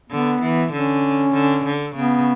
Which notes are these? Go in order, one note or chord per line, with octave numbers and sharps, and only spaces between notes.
D3 B3
E3
D3 C#4
D3
D3
C#3 B3